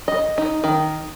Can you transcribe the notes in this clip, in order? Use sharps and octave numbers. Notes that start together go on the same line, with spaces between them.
D#5
D#4
D#3